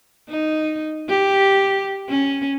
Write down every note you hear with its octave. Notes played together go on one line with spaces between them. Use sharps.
D#4
G4
C#4